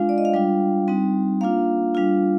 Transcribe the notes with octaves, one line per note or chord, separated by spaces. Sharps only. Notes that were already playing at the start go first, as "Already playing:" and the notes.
Already playing: G#3 D4 F4 F5
D5
D#5
F5
G3 D4 F4 G5
G3 C4 D#4
A#3 D4 F4 F5
G3 D4 F4